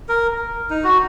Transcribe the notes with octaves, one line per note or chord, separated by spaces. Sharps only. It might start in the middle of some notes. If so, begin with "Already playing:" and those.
A#4
D#4
F#4